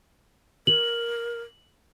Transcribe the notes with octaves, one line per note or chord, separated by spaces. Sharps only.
A#4 F#7